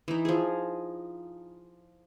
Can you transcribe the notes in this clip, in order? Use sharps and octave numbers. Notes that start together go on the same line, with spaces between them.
E3 D#4
F3 G#4